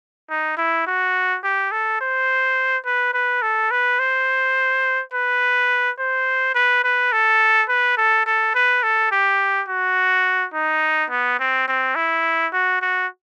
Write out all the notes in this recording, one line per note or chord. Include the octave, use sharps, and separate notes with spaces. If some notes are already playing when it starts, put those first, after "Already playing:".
D#4
E4
F#4
G4
A4
C5
B4
B4
A4
B4
C5
B4
C5
B4
B4
A4
B4
A4
A4
B4
A4
G4
F#4
D#4
B3
C4
C4
E4
F#4
F#4